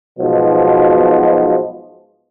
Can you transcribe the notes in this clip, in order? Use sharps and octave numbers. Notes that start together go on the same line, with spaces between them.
B1 G#2 B2 F3